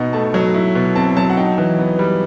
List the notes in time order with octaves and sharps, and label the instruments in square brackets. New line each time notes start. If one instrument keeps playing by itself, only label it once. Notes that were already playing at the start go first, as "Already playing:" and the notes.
Already playing: [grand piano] B2 D#4 F#5
A3 A5
F#3
E4
B2
C4 A5
F#3 A5
F#5
D#4 G5
E3
B3
G3